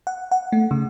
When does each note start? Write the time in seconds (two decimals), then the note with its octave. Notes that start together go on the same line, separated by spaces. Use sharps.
0.07 F#5
0.31 F#5
0.52 A3
0.71 C#3